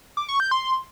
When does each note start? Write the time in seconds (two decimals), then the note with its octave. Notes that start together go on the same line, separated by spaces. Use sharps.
0.17 D6
0.28 C#6
0.40 G6
0.51 C6